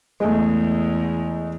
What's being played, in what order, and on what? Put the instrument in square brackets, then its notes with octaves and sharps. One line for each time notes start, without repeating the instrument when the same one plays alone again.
[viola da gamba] E2 [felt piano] G#3 A3